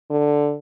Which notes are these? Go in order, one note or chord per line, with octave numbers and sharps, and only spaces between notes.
D3